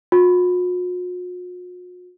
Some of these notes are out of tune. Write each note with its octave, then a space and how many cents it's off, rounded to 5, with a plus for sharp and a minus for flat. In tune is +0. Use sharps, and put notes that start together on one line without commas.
F#4 -45